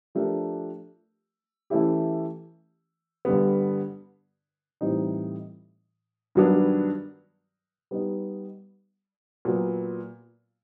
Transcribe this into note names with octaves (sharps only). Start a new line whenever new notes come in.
F3 A3 D4 G4 A#4
E3 A3 C#4 E4 G4
G2 D3 G3 B3
A2 E3 G3 C4 D#4
G2 D#3 F#3 B3 D4
G3 B3 D#4
A#2 F#3 B3